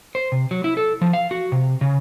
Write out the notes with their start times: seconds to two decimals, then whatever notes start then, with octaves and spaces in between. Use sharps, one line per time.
0.15 C5
0.32 C3
0.51 F#3
0.64 E4
0.77 A4
1.01 F3
1.13 F5
1.31 F#4
1.52 C3
1.81 C#3